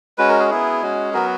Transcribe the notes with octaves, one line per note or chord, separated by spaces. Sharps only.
G#3 C#4 F#4 B4
A#4
G#4
B3 E4 G#4
G#3 C#4 F#4
F#3 B3 F#4 A#4